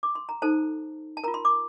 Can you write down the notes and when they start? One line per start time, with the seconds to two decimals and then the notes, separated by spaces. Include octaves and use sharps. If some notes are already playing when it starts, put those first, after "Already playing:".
0.03 D6
0.15 C6
0.29 A#5
0.42 D#4 A4 C5 A5
1.17 A5
1.24 A#4 A#5
1.28 F4
1.34 C6
1.45 D6